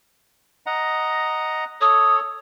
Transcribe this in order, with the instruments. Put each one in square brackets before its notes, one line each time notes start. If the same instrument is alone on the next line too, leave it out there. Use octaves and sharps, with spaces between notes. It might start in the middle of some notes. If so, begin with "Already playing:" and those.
[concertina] D#5 F#5 A#5
[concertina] A4 C#5 [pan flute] D#6